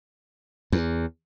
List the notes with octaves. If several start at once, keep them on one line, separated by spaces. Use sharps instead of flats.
E2